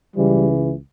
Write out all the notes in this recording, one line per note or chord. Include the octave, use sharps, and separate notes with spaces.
C#2 C#3 E3 G3